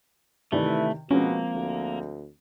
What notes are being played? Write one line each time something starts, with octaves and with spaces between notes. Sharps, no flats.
C3 D#3 E3 A3 D5
B2 F3 G#3 A#3 C4 C#4
D2